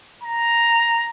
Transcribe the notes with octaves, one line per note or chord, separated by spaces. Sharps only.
A#5